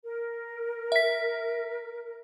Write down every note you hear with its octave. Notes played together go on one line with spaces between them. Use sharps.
A#4
E5 B6